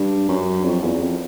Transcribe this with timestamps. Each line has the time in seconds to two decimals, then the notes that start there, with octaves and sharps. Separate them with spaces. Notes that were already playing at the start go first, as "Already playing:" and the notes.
Already playing: G2
0.29 F#2
0.65 F2
0.83 E2
1.00 F2